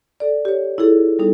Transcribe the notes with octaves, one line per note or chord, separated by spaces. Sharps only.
A4 D5
G4 C#5
E4 F4 G#4 A4
G3 B3 D#4 A4